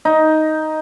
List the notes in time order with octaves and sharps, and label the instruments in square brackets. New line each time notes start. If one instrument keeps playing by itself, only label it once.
[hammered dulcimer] D#4